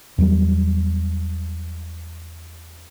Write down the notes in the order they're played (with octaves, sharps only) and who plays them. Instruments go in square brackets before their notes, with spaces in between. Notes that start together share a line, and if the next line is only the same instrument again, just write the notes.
[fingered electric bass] E2 F#3 G3